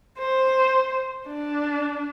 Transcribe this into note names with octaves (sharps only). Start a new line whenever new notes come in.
C5
D4